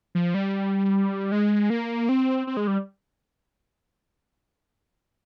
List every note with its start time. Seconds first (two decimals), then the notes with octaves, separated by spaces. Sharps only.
0.15 F3
0.34 G3
1.32 G#3
1.70 A#3
2.09 C4
2.47 C4
2.57 G#3
2.67 G3